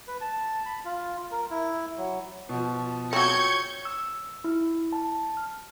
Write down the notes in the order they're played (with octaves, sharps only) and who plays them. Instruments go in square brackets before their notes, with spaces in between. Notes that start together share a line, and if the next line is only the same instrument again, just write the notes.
[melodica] B4
A5
B5
F4
A#4
E4
F#3
[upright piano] B2 F3
[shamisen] F#3 C4 [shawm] C#5 [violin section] G6 G#6 C#7
[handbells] E6
E4
A5
F6